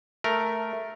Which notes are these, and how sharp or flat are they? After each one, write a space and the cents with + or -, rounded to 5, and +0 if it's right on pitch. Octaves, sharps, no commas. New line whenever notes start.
A3 +0 A#4 +0